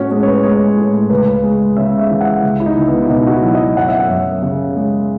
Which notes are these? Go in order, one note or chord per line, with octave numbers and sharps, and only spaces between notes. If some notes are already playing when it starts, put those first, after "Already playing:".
Already playing: A2 C#4 F#4
G#3 C#4
C#5
B4
G#3 C#5
A2
C#2 B4
G#3
C#3 E5
E5
E3
F#5
C#2
E4
D#4
C#2
B3
E4
B2 D#4
F#4
E4
F#3
D#5
F#2 F#5
E5
F#5
F#2
C#3
G#3